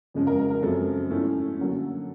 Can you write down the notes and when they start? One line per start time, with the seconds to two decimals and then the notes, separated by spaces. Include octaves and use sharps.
0.14 F2 C#3 F3 G#3 C#4
0.27 A#4
0.39 A#4
0.50 A#4
0.62 F#2 C#3 F3 G#3 C4 A4
1.10 G#2 F3 A3 C#4 E4 A4
1.58 D3 F#3 A#3 C#4